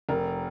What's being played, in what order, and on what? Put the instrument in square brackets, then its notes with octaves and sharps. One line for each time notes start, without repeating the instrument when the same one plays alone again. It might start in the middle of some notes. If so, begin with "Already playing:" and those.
[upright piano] F1 A#4